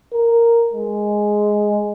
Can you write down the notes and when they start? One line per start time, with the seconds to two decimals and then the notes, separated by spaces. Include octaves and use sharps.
0.13 A#4
0.73 G#3